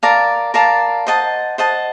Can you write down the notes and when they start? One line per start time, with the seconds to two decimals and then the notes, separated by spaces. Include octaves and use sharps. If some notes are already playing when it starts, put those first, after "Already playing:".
0.03 A#4 D5 F5 A5
0.54 A#4 D5 F5 A5
1.07 C5 D#5 F#5 A5
1.58 C5 D#5 F#5 A5